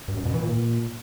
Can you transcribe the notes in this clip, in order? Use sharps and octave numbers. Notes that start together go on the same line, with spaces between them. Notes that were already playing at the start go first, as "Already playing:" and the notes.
G2
F#2
B2
E3
A#2